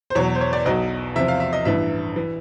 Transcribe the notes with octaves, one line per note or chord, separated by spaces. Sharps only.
C5
E2 B2 F#3 C#5
C5
C#5
D5
B1 B2 F#3 D#5
E2 C3 F3 E5
F5
E5
D#5
A1 G2 E3 E5
E3